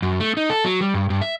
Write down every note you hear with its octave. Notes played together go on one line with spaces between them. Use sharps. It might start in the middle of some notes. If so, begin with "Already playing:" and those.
F#2
A3
D#4
A4
F#3
G3
G2
G2
E5